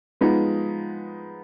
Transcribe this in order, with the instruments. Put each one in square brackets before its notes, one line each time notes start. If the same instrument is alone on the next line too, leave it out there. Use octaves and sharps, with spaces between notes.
[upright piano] F3 G#3 B3 D#4